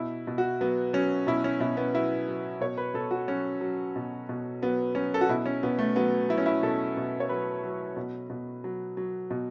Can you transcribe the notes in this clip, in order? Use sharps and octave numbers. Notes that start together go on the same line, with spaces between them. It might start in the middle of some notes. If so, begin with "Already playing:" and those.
Already playing: B2 E4
B2
F#4
F#3 B3
F#3 C#4
B2 E4
C#4
B2 E4
B3
F#3 E4
F#3
B2 C#5
B4
B2 A4
F#4
F#3 C#4
F#3
B2
B2
F#3 B3
F#3 C#4
A4
F#4
B2 E4
C#4
B2 B3
A3
F#3 B3
F#3 E4
C#4
E4
B2 A4
B2
C#5
F#3 B4
F#3
B2
B2
F#3
F#3
B2